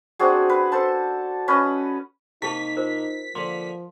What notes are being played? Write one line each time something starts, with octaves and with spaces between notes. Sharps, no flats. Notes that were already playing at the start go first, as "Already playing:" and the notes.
C4 D4 F#4 G#4
B4
A4 C5 A5
C#4 B4 D#5
C3 A#3 D#4 E4 G4 A5 B6
F4 A#4 C5
D3 F3 A#3 C6